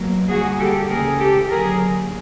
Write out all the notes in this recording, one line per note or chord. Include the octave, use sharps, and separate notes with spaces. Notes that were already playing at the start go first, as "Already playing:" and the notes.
Already playing: B2 F#3 A#3
D3 G3 A#3 F#4 G#4
G4 A4
C#3 E3 G#3 G#4 A#4
G4 A4
D3 F#3 A#3 G#4 A#4